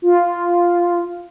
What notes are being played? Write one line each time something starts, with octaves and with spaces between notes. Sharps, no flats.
F4